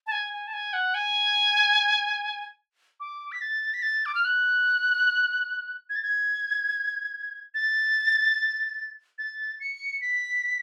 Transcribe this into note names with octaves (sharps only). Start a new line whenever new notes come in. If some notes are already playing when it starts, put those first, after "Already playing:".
A5
G#5
G#5
A5
G#5
F#5
G#5
D6
B6
A6
B6
A6
D6
F6
F#6
G#6
A6
G#6
A6
A6
C#7
B6